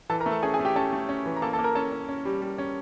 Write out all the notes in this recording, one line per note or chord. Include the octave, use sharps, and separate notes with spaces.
E3 A4 A5
A#4 A#5
A3
A4 A5
C#4 G#4 G#5
G#4 G#5
A3
G4 G5
C#4 A4 A5
A3
C#4
E3
A#5
A#3 A4 A5
A4 A5
A#3
A#4 A#5
C#4 A4 A5
C#4
C#4
G3
G3
C#4